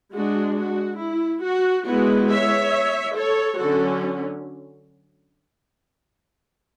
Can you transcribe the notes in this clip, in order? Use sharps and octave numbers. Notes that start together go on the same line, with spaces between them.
G#3 D4 F#4
F#4
E4
F#4
G#3 B3 E4 F#4
C#5 E5
A4 C#5
D3 F#3 C#4 F#4 A4